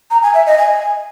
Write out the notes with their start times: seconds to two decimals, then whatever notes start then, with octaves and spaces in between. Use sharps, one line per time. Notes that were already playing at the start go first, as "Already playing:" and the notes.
0.11 A#5
0.23 G#5
0.35 E5
0.46 D#5
0.58 G#5